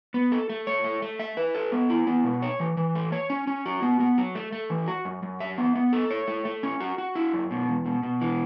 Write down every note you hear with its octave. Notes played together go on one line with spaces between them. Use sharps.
B3
A4
A3
C#5
A3
A3
E5
B4
A4
B3
E4
B3
B2
C#5
E3
E3
A3
C#5
C#4
C#4
F#4
B3
B3
F#3
A3
A3
E3
F#4
F#2
F#2
E5
B3
B3
A4
C#5
A3
A3
C#4
F#4
F#4
E4
F#2
B2
E2
B2
B2
E3